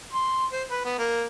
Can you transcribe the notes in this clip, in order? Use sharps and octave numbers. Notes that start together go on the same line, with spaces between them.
C6
C5
B4
B3
A#3